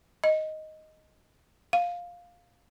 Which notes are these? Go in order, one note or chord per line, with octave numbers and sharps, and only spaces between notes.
D#5
F5